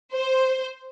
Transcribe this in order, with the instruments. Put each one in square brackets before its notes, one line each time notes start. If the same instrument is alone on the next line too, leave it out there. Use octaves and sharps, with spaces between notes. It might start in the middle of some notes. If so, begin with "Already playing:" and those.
[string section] C5